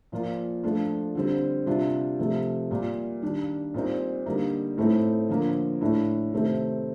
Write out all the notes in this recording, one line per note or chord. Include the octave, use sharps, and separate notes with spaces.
A#2 F3 A#3 F4
F3 A3 D4 F4
D3 G3 C4
C3 G3 D4 F4
C3 F3 A3
A#2 G3 A#3
D#3 G3 D4
A#2 G3 C4 D#4
D3 G3 A#3 D#4
A2 A3 C4 D#4
D3 F3 A#3
A2 A3 D4
C3 D#3 A3 C4